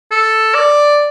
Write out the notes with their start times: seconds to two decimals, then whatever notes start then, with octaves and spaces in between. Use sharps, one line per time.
0.11 A4
0.55 D5